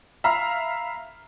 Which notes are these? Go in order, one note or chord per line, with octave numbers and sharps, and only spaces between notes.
E5 F5 A#5 B5 F6